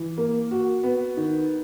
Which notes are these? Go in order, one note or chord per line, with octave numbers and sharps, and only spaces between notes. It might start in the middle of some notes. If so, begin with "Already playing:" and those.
Already playing: E3
A#3
F#4
B3
D#3